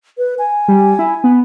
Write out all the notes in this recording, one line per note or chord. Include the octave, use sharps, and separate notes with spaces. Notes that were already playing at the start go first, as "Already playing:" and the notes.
B4
G#5
G3
E4
B3